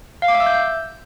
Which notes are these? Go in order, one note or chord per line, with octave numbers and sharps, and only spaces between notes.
F5
D6
E5
E6
G6